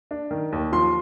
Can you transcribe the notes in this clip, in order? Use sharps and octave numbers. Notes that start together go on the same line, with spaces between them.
D4
D#3
D#2
F3 C6